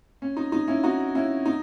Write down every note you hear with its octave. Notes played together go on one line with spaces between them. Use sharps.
C#4
D#4
D#4
C#4 E4
D#4 F#4
C#4 E4
D#4